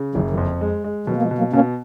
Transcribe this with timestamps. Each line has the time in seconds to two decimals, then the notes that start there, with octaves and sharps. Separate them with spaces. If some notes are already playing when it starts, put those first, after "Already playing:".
Already playing: C#3
0.15 F#1 D#3 F#3
0.30 D#3 F#3
0.38 F2
0.61 G#3
0.84 G#3
1.07 B2 D#3 F#3
1.16 A#3
1.22 F3 G#3
1.31 B2
1.38 F#3 A#3
1.53 B2 A#3 C#4